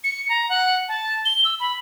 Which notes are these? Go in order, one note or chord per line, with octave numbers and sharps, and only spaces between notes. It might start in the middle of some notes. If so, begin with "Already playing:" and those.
C#7
A#5
F#5
A5
G7
E6
B5